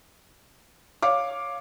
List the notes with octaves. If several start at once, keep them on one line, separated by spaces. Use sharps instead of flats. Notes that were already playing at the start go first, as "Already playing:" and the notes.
C#5 F5 D6